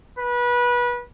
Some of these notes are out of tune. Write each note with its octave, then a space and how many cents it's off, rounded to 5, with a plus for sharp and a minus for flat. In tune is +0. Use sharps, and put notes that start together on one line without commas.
B4 -25